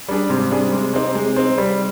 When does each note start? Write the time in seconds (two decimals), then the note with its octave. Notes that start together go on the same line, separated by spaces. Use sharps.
0.09 G3 D4 G#4
0.29 G#2 C3
0.51 G3 D4 G#4
0.73 G#3
0.94 C4 D#4
1.15 G#3
1.36 C4 D#4
1.58 G3